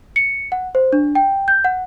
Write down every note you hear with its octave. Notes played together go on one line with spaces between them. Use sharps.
C#7
F#5
C5
D4
G5
G6
F#5